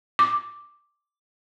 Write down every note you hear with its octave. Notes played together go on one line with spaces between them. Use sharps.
D6